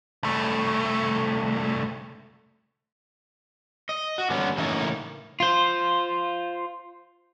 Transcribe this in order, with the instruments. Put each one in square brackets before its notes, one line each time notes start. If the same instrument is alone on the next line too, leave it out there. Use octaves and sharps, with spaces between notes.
[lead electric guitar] C2 A3
[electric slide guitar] D#5
F#4
D3 G3 B3 C#4
A2 C#3 E3 A#3 D#4 E4
[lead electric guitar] F4 C5